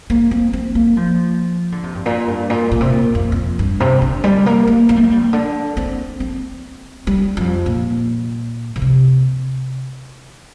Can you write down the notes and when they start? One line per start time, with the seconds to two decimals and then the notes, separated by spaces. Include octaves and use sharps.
0.10 A#3
0.31 C4
0.53 C4
0.75 A#3
0.97 F3
1.72 D3
1.83 C3
1.95 G2
2.06 A#2
2.28 G2
2.50 A#2
2.72 A#2
2.81 C3
2.89 A#2
3.15 F2
3.32 F2
3.59 G2
3.80 C3
4.02 D3
4.24 G3
4.46 A#3
4.67 A#3
4.89 A#3
4.96 G3
5.03 A#3
5.11 G3
5.23 C3
5.33 D3
5.77 C4
6.20 C4
7.07 G3
7.37 F2
7.66 A#2
8.76 D3
8.82 C3